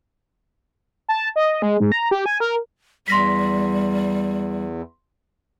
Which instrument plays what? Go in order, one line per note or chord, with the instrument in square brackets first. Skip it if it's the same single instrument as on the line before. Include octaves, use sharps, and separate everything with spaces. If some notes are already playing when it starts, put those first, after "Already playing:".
[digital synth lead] A5
D#5
G#3
G#2
A#5
G4
G#5
A#4
[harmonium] E2 [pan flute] G3 [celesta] C6 A#6 B6